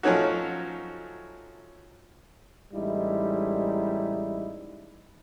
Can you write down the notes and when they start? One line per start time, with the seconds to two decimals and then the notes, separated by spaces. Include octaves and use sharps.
0.03 F3 F#3 A3 C#4 D#4 F#4
2.73 A1 G3 G#3 D#4 E4